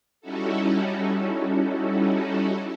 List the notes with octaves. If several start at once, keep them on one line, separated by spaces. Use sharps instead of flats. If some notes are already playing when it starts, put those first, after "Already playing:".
G3 C#4 D#4 E4 F#4 A4